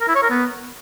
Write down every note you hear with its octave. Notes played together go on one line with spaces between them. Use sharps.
A#4
E4
C#5
A#4
B3